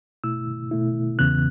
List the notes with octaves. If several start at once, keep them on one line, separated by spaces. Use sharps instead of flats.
B2 A3 E4 E6
B2 A3 E4
E2 C#3 E3 B3 F#6